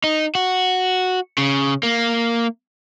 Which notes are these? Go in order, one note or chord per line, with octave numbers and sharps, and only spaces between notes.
D#4
F#4
C#3
A#3